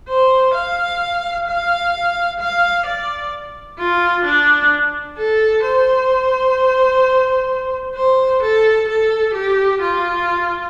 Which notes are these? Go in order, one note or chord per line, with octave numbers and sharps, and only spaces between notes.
C5
F5
F5
F5
D5
F4
D4
A4
C5
C5
A4
A4
G4
F4